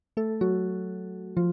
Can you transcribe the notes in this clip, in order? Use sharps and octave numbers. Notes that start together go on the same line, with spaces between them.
A3 A4
F#3 F#4
F3 F4